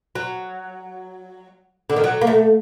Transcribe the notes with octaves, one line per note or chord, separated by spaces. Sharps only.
F#3
D3
D#3
F#3
A#3
A3